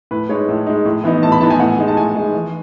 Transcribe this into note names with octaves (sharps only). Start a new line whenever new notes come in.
A2 B4
G#3 D#4 C#5
A2
G#3 D#4
A2
E3 B3 D#4
A2 A5
B5
E3 B3 D#4 A5
G#5
A2 F#5
G#3 D#4
A5
A2 G#5
G#3 D#4
E3